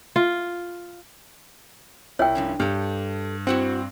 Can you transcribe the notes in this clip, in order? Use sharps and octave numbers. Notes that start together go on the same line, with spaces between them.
F4
C2 E4 C#5 G5
G2 F3 C#4
G2 G4 A4
C4 E4 F#4 F#5